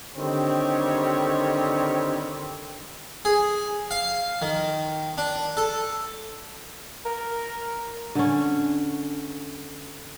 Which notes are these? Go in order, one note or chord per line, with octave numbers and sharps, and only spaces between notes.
D3 D#3 G3 C4 C#5
G#4
F5
D#3
D4
A4
A#4
D3 C#4